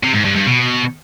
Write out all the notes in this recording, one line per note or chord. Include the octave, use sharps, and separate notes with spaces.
C3
G#2
G2
G2
B2